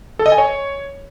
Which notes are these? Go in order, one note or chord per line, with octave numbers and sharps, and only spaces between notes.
A4
D#5
G#5
C#5